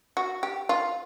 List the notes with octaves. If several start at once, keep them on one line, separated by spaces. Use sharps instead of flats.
F#4
G4
F4